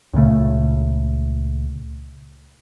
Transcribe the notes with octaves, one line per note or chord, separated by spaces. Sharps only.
C#2 A#2 C#3 A3